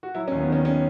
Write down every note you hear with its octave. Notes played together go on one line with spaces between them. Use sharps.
F#4
F#3 E4
C#4
D#2
B3
D#3 C#4
C#4